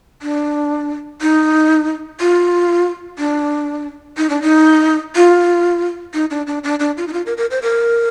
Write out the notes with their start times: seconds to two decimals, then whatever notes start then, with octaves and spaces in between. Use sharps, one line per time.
0.22 D4
1.21 D#4
2.20 F4
3.18 D4
4.17 D#4
4.30 D4
4.42 D#4
5.15 F4
6.14 D#4
6.31 D4
6.47 D4
6.64 D4
6.80 D4
6.97 F4
7.08 D#4
7.13 F4
7.26 A#4
7.37 A#4
7.51 C5
7.62 A#4